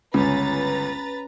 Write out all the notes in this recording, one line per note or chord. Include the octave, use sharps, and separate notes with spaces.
G1 C#2 C#4 B4 A#5 A6